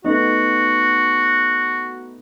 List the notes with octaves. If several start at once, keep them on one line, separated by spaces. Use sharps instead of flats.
A3 B3 D#4 F#4